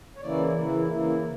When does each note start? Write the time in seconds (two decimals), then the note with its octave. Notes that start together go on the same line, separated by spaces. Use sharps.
0.16 C#5
0.21 C#3 E3 A#3 E4 D5
0.55 C#3 E3 A#3 E4
0.89 C#3 E3 A#3 E4
1.22 C#3